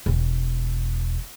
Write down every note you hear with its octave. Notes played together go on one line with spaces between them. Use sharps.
E1